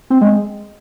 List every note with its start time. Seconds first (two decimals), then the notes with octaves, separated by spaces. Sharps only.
0.10 C4
0.21 G#3